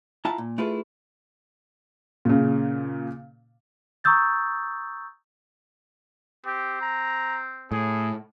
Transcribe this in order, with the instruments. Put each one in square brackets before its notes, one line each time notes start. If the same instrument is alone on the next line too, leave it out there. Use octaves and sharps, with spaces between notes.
[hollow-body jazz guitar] E4 F4 E5 F#5 A5 A#5
A#2
A3 E4 F4 G#4 B4
[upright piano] A#2 C#3
[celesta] A#5 C#6 D#6 E6 G6 A6
[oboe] C4 [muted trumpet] G4
[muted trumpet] A#5
[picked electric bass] A2 [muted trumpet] G#4